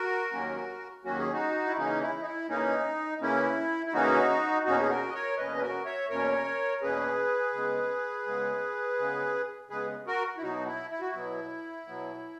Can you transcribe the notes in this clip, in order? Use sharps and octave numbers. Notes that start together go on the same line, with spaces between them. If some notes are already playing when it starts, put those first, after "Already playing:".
Already playing: F#4 A#4
D#2 D#3 F#3 A#3 C#4
D#2 D#3 F#3 A#3 C#4 F#4
G#4
D#4 F#4
E4
C#3 E3 A#3 C#4 D#4
E4
D#4
E4
C#3 E3 A#3 C#4 D#4
C#3 E3 A#3 C#4 E4
E4
C#3 E3 A#3 C#4 D#4 F#4
E2 B2 A#3 C#4 D#4 F#4
G#4
F#4 A#4
D#5
A#4 C#5
E2 B2 A#3 C#4 B4 D#5
B4
F#4 A#4
C#5 E5
E2 B2 A#3 C#4 A#4 C#5
E2 B2 A#3 C#4 G#4 B4
C#3 G#3 B3
C#3 G#3 B3
C#3 G#3 B3
C#3 G#3 B3 G#4 B4
F#4 A#4
E4
B2 F#3 B3 D#4 F#4
E4
E4
F#4
B2 F#3 B3 E4
B2 F#3 B3